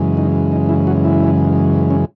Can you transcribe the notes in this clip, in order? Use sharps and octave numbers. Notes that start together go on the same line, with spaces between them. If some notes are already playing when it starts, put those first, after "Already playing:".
Already playing: F#2 C#3 E3 G#3
D#4
D#4
E4
F#4
E4
C#4